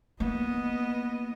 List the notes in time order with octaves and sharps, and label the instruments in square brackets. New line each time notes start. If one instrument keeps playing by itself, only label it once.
[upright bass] A#3 [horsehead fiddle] B3 D#5